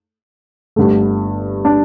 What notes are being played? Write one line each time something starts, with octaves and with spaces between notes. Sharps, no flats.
G1 G2 D3 A3
D4